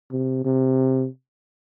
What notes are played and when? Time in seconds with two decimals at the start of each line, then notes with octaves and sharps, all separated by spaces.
0.11 C3
0.45 C3